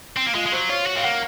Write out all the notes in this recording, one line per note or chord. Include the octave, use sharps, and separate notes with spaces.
C4
A#3
G#3 F4
G#3
F#3 C5
F4 C#5
F#4
C4 F5
A#3 F#5